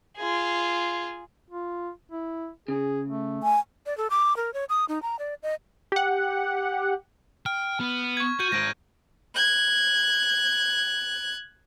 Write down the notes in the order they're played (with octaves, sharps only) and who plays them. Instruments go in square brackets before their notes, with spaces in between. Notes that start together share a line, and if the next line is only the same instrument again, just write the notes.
[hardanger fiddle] F4 G#4
[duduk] F4
E4
[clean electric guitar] C#3 [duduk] G#4
[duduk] A3
[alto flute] G#5
[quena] D5
A4
D6
A#4
C#5
D#6
D#4
A#5
D5
D#5
[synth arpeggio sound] G4 F#5
[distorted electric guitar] G5 [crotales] F6
[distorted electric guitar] B3
[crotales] C#6 G#6
[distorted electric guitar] F#4 [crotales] G6 D#7
[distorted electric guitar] G#2 C4 [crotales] A#6 D7
[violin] F#6 G#6